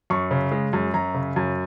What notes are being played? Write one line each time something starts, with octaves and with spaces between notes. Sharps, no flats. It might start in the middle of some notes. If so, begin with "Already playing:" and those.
F#2 C#6
C#3
G#3
F#2
F#2 A#5
C#3
F#2